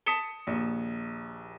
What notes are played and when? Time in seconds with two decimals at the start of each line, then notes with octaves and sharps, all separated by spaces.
0.06 A5 D#6 B6 C#7 E7 G7
0.47 A#1 D#2